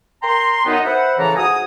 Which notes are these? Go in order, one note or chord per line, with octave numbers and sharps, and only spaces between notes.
A#4 G5 A#5 C6
F#2 B3 D#4
B4 C5 E5 F#5
A2 C#3 E3 A4 A#5
G#2 F#4 G#5 D#6